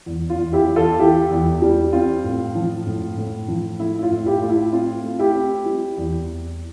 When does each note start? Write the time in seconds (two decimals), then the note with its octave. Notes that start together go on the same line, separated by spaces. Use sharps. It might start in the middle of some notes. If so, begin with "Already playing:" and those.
0.06 E2
0.30 F4
0.37 E2
0.53 E4 G4
0.68 E2
0.76 F4 A4
0.99 E3 E4 G4
1.31 E2
1.62 G3
1.93 C4 F4
2.24 A2
2.55 F3
2.86 A2
3.17 A2
3.48 F3
3.79 A3 E4
3.99 E4
4.03 F4
4.11 A2
4.26 E4 G4
4.42 A3 F4
4.49 E4
4.73 C4 F4
5.04 A3
5.19 E4 G4
5.35 C4
5.66 G3
5.98 E2